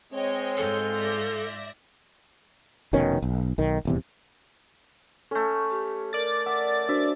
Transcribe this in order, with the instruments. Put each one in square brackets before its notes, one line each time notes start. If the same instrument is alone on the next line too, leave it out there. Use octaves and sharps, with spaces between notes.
[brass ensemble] G#3 C4 [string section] C#5 D#5 G5
[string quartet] G#2 F4 G6 [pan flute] A4
[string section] D5 E5 A#6
[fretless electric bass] F1 B2 D#3 C#4
B1
B1 D#3
D#1 E2 C3
[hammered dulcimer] A3 C#4 [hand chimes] A4
[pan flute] G4
[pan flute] A#4 [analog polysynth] D5 A6
[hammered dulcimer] E5 [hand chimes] F#5
[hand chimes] D4 F#4 C5 [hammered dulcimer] E5